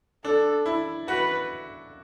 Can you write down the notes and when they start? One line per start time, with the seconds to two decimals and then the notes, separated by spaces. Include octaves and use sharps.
0.24 D4 A4
0.66 E4
1.08 F#4 B4